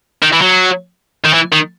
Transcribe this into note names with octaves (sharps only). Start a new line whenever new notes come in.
D#3
E3
F#3
D#3
E3
D#3